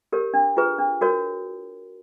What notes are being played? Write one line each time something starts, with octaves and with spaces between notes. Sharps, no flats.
G4 A#4 C#5
D4
F4 G#4 B4
D4
F#4 A#4 C#5